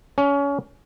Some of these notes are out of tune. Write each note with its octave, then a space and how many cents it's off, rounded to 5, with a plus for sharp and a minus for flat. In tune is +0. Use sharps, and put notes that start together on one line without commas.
C#4 +25